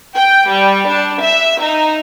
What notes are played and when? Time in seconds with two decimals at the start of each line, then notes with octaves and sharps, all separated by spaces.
0.17 G5
0.49 G3
0.88 D4
1.24 E5
1.62 D#4